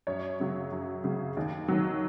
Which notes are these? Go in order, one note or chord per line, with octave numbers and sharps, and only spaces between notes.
F#2 C#5
C#3 F#3
F#2
C#3 F#3
D#2
D#3 F#3